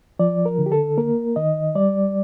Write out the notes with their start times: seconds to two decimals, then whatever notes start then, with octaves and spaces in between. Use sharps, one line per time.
0.19 F3 D5
0.46 A#4
0.58 D3
0.66 G4
0.72 A4
0.98 A#3 A#4
1.36 D#3 D#5
1.75 G3 D5